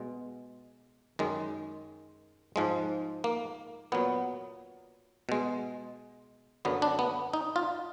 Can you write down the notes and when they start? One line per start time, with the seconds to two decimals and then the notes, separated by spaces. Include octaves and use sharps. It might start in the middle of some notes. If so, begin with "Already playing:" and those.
Already playing: B2 G#3
1.19 F#2 D#3 G#3
2.56 G#2 F3 G#3
3.24 A#3
3.92 A#2 F#3 B3
5.29 B2 G#3
6.65 F#2 D3 F#3 B3
6.82 D4
6.99 B3
7.33 D#4
7.56 F4